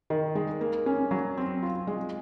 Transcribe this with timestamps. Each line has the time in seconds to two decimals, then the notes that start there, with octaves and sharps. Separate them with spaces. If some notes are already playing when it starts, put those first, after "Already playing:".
0.10 D#3
0.35 G#3
0.61 A#3
0.86 C#4
1.11 F#3
1.37 C4
1.62 F4
1.87 G#3